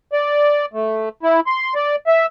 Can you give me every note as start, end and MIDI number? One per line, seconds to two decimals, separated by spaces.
0.13 0.66 74
0.73 1.09 57
1.23 1.40 64
1.47 1.74 84
1.75 1.96 74
2.07 2.26 76